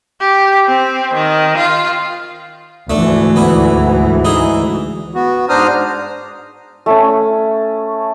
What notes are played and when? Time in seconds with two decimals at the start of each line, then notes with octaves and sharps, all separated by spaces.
0.21 G4
0.67 C4
1.14 D#3
1.57 F4
2.90 D2 G#2 E3 A3 D4
3.36 B3 E4
4.25 D#4 E4 G#4
5.15 B3 F#4
5.49 G#2 D4 C5 A#5 D#6 F6
6.86 A3 C#4